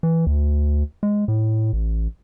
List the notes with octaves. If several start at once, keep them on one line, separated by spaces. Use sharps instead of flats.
E3
D2
G#3
A2
A1